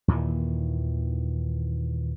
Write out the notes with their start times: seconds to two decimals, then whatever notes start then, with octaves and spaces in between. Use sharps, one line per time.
0.08 D#2 A#2 D#3 E3